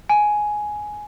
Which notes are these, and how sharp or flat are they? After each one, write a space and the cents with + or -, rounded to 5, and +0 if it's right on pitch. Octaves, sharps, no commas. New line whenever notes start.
G#5 +10